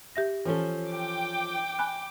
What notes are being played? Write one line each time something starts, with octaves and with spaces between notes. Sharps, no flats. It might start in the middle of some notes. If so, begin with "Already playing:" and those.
G4 E5 A#6
E3 F3 C#4 A4
G5 D6
G#5 B5 F#6